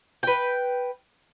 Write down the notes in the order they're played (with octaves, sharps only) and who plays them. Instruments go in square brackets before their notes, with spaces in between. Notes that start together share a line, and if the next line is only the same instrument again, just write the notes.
[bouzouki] B4 G5